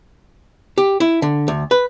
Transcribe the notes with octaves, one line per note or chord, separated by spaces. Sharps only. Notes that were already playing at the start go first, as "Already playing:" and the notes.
G4
E4
D3
D2
B4